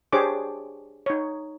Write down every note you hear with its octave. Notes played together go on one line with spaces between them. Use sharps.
D4 G4 G#4 C5 C#5 D6
D#4 C#5